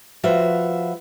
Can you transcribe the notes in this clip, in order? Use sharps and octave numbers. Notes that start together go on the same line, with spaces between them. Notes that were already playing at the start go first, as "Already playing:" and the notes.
F3 F4 F#4 B4 E5